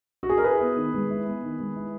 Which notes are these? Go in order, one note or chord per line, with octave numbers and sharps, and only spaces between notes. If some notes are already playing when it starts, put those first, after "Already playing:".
F#4
G#4
A#4
E4 G#4 B4
B3
D#3
G#3
E4
B3
D#3
G#3
E4